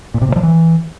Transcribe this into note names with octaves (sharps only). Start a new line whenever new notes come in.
A#2
C3
A#2
F3
E3